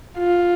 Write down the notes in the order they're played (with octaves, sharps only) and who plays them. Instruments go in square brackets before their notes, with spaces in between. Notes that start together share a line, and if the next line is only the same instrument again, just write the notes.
[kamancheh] F4